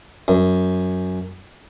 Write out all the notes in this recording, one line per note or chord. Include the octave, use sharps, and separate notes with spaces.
F#2